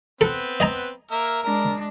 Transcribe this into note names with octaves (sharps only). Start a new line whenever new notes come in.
B3 C4 A4 B4
D#5 G#5 A#5
A#3 A#4 E5
G#3 D4 A#4